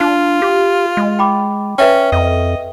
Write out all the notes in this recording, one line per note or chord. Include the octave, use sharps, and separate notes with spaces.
D4 F4
G4
G#3
G5 B5 D6
C#4 B4 E5 G5
F2 D#5